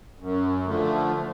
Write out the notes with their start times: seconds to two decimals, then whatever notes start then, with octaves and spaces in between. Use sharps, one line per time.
0.20 F#2
0.66 D3 F3 A3